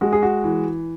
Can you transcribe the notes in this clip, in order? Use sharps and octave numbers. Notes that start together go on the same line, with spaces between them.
G#3 F#4
G#4
F#4
E3